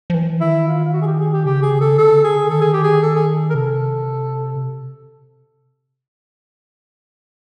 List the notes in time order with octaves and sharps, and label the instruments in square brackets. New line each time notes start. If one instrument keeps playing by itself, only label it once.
[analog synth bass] F3
E3
[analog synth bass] D#3 [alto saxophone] E4
[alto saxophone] F4
F4
F#4
G#4
G4
G#4
G4
[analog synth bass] C#3 [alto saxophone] G4
[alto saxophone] G#4
A4
[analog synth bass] D3 [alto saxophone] A4
[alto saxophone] G#4
[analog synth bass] D#3 [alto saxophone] A4
[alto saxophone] G#4
G4
G#4
A4
G#4
A#4
[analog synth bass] C3 [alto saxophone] A4